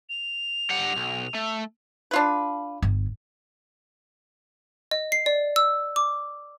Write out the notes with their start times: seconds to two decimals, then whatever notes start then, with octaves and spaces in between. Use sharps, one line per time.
0.09 F7
0.70 G3 F#5
0.97 B1
1.35 A3
2.11 D4 F4 B4
2.82 G1
4.91 D#5
5.12 C7
5.26 D5
5.56 E6
5.96 D6